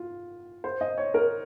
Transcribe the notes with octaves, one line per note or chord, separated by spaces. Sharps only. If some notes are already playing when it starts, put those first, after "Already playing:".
Already playing: F4
C5
D#5
C#5
A#4